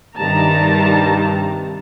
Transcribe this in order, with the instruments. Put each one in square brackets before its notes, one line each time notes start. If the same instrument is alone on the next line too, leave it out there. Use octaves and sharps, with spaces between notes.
[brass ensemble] G2 C3 [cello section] D#3 G3 [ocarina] G4 [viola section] A5 A#5